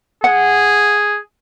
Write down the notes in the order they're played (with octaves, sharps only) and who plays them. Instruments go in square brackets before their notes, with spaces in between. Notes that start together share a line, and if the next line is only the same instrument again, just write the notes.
[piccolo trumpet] G#4 [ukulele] F#5